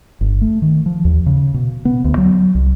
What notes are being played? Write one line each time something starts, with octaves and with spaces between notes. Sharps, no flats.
G1
A3
D#3
F3
D#2
C#3
B2
B3
D2
F#3
C2